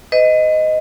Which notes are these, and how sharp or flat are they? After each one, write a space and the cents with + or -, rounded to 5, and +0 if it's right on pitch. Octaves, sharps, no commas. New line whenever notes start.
B4 +40 D#5 +0